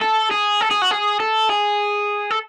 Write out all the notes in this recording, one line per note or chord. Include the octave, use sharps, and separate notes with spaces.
A4
G#4
A4
G#4
F#4
G#4
A4
G#4
A4